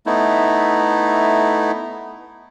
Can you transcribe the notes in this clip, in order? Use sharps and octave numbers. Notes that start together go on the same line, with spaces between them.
A3 B3 D#4 E4